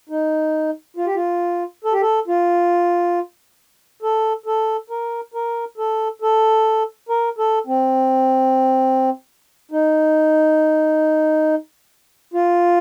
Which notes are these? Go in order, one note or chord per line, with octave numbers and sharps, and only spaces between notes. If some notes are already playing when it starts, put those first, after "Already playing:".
D#4
F4
G4
F4
A4
G4
A4
F4
A4
A4
A#4
A#4
A4
A4
A#4
A4
C4
D#4
F4